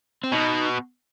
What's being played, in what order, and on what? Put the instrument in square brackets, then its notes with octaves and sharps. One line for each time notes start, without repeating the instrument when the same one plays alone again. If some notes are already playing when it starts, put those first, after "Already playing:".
[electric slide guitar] C4
[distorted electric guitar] B2 [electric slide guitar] D#4